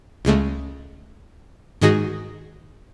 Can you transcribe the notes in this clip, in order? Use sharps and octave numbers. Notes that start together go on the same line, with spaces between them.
C#2 C#3 G#3 A3
G#2 D#3 G#3 F#4 G#4 A#6